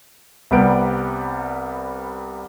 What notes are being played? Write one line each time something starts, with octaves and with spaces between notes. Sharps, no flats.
C2 C3 G3 B3 D7